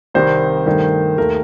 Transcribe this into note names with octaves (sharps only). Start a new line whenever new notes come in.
C2 C3 D#3 G3 C5
G2 D#3 A3
D#2 D#3 A3 A#4